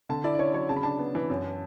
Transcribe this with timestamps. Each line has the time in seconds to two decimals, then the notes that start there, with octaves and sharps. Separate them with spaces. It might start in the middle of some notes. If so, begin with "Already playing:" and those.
0.09 D3 A5
0.24 E4 D5
0.35 D5
0.39 C#4 C#5
0.54 F#3 C#5
0.69 C#3 A5
0.76 B5
0.83 D4 A5
0.99 B3
1.15 E3
1.30 F#2